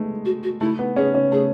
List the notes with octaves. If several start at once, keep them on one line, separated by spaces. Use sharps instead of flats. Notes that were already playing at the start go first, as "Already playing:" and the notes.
Already playing: G#3 A3 B3
F#4
F#4
A3 E4
B3
C#4 G#4
C#4
A3 G#4